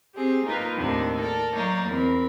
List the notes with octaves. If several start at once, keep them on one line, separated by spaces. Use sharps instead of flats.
C4 G4 G#4
A#3 D#4 F4 A#4 B4
D#2 A2 D#3 C4 D4
A4 A#4 D5
F#3 A#3 D#4 C#5 D5
E2 C4 A#4 B5